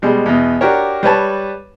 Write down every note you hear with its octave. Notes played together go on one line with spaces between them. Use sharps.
B2 G3 G#3
E2 B2
D4 F#4 G4 A#4 C#5
G3 B4 C#5 A5